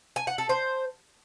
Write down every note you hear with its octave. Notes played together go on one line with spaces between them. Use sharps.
G#5
F#5
A4
C5